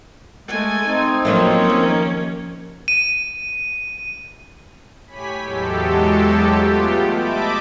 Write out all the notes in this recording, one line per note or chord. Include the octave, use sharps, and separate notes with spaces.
G#3 A3 G#5
C4 D#4
F3 F#3 A3 A#3 C#4
D#2
D#7
A2 G4 C#5 G#5 B5 B6
E2 F#3 G#3 G4 A4
A3 B3 F4 G4
D#5 E5 A5 B5 D6